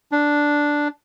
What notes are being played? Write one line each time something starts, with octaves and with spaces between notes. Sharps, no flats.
D4